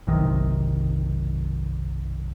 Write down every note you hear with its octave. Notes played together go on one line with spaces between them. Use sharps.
F#1 B1 C3 D#3